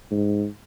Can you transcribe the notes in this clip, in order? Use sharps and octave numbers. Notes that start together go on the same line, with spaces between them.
G#2